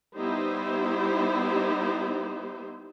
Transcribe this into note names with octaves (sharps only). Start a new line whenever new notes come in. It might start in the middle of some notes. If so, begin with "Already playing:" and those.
G3 B3 D#4 E4 G4 C5